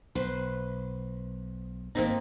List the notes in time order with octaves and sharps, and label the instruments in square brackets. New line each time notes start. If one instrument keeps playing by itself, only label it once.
[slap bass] B1 [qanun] B4 C5
[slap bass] G#1 G2 [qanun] A#3 C4 D#4